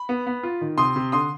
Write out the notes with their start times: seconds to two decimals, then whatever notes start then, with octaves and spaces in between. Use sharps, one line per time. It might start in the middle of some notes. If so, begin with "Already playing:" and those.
Already playing: B5
0.09 B3
0.27 B3
0.43 F4
0.61 D#3
0.78 C3 C6 D#6
0.96 C3
1.12 D3 C6 D#6